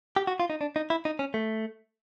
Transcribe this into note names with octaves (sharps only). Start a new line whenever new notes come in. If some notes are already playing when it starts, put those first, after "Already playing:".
G4
F#4
F4
D#4
D4
D#4
E4
D#4
C#4
A3